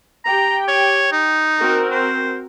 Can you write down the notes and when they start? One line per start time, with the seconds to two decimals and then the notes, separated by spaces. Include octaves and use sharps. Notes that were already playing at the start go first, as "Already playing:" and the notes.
0.25 G4 G5 A#5
0.68 C#5
1.12 D#4
1.59 C4 F#4 A#4
1.92 C5